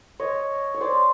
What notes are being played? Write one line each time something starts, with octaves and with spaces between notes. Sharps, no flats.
C#5 D#5
C#5
C5 D5